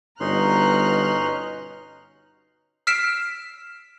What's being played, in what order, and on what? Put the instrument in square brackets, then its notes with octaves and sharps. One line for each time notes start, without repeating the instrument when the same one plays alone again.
[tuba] G1 [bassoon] B2 [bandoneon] C#4 D#4 C6 [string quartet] A#5 F6 F#6
[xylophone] E6 F6 B6 C7 D7 E7